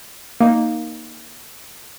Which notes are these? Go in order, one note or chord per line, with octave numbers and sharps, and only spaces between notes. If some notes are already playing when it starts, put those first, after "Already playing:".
A#3 D#4